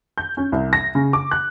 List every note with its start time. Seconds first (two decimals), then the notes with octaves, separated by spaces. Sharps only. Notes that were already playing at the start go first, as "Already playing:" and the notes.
0.18 G6
0.37 C#4
0.52 C2
0.73 A#6
0.95 C#3
1.13 D6
1.31 F#6